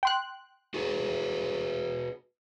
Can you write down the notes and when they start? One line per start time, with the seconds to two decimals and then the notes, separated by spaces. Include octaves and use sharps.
0.03 G5 C6 F#6
0.74 F#4 G#4 B4